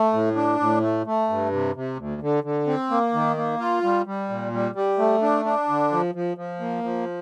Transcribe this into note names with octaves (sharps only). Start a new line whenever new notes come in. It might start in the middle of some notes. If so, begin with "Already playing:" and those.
Already playing: A3
A2
D4
A2
A3
A3
G2
C3
C3
D2
D3
D3
C4
A#3
D#3
A#3
F4
G3
G3
A#2
G3
G3
A3
D4
D4
D3
F3
F3
F3
A#3
F3